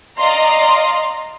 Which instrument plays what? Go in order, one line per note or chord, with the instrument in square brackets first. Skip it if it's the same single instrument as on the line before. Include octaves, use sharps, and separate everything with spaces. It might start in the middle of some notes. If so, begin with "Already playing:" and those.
[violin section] D5 D#5 F5 A#5 C6